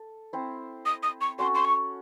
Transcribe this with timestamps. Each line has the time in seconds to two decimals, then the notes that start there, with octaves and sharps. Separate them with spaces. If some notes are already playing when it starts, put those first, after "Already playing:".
Already playing: A4
0.33 C4 E4 C5
0.86 D#6
1.03 D#6
1.21 C#6
1.39 C#4 F#4 A4 C#5 C6
1.55 C6
1.65 C#6